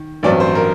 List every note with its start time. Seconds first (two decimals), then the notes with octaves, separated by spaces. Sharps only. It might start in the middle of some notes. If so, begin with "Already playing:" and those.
Already playing: D#3
0.23 A1 G2 F#3 C4 D5
0.40 C5
0.55 A#4